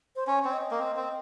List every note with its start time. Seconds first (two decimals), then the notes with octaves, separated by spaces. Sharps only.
0.16 C5
0.27 C#4 C#5
0.45 C4 C#5
0.53 D#5
0.71 A#3
0.80 C4
0.97 C4